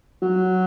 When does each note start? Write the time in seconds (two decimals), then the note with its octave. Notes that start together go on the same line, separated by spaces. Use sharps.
0.22 F#3